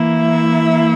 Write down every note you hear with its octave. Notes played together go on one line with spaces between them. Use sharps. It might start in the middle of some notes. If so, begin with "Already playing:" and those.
Already playing: E3 A#3 E4
E5